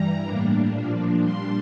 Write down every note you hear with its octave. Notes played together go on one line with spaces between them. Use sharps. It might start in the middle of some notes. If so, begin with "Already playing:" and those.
Already playing: G2 E3 G3 A#5
A2 G3 A#3 D4
A#2 F3 A#3 D4
A#2 G3 D4 C6